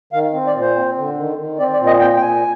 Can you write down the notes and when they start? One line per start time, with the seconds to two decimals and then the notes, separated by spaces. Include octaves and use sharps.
0.13 D#3 F5
0.33 C4
0.47 D5
0.55 A#2
0.61 C5
0.76 C4
0.97 D3
1.17 D#3
1.38 D#3
1.59 C4 D5
1.73 D5
1.79 A#2
1.87 D#5
2.00 C4 G5
2.17 G5
2.21 A#2 G#5